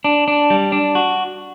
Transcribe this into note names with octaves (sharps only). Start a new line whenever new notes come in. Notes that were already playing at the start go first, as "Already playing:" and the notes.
D4
D4
G3
D4
F#4